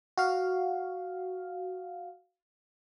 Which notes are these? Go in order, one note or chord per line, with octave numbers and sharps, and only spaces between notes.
F#4 F5